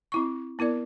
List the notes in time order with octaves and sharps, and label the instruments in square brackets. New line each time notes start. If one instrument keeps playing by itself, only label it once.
[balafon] C4 E4 C#6
B3 E4 A#4 D5